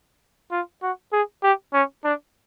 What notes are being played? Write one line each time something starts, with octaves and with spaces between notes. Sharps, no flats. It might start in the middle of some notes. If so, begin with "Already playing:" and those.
F4
F#4
G#4
G4
C#4
D4